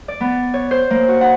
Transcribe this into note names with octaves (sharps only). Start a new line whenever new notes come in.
D5
B3
C#5
C5
A#3
F#4
F#5